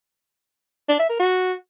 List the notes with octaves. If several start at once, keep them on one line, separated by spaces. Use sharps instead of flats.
D4
E5
A#4
F#4